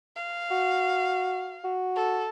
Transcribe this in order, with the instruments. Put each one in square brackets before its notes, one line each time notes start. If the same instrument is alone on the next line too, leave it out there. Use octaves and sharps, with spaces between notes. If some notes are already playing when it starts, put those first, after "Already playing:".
[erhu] F5
[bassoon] F#4
F#4
[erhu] A4